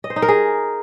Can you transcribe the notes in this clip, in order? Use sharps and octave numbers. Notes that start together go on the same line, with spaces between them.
D#5
C5
D#4
A#4
G#4